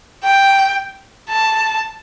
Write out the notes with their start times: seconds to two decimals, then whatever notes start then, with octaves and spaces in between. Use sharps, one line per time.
0.24 G5
1.29 A5